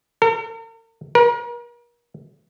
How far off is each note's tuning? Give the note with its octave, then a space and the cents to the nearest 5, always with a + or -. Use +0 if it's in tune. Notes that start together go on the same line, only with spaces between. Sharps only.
A#4 -45
A#4 +40